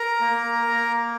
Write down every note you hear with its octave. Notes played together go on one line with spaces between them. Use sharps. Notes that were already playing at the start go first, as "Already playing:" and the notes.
Already playing: A#4 A#5
A#3
A#3